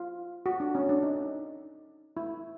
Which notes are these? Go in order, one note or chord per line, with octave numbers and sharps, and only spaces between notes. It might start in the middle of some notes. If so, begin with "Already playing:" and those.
Already playing: F4
F#4
D4
C#4
D4
D#4
E4